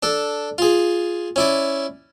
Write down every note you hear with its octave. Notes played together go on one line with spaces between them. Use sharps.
D4 A4
F4 G#4
C#4 E4 D5